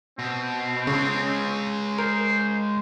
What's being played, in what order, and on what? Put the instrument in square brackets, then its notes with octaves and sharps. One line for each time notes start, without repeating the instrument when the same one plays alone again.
[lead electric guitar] B2 [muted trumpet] C4
[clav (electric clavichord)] C#3 [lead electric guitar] G#3 C#5
[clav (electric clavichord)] A#4 [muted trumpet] C5